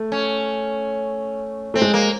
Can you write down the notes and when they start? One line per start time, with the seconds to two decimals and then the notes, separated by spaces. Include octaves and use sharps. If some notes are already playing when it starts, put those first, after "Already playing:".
Already playing: A3
0.12 C#4
1.74 A3 C4
1.82 G#3
1.94 A#3